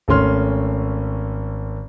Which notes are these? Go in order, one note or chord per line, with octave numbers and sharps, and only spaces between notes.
G#1 A3 C#4 C6 F6